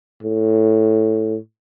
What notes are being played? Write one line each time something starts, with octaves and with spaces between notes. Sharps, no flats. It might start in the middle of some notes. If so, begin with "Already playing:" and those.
A2